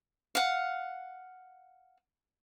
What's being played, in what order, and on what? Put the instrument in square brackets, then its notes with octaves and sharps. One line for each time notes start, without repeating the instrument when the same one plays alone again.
[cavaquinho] F5 F#5